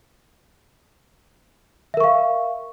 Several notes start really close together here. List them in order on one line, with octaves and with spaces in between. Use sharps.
E5 A#4 C#6 F5